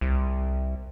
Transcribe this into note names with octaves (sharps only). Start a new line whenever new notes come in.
C2